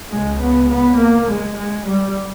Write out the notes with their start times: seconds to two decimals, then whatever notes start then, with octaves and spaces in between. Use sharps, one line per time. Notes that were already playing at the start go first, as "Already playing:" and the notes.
0.11 C#2 C#3 G#3
0.40 B3
0.69 B3
0.98 A#3
1.27 G#3
1.56 G#3
1.85 G3